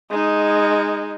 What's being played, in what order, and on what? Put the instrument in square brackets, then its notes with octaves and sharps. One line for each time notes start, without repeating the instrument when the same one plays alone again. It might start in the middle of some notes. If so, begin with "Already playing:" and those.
[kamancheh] G#3 D#4